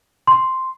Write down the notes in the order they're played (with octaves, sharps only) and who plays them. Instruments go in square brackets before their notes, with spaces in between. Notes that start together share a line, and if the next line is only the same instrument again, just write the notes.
[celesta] C6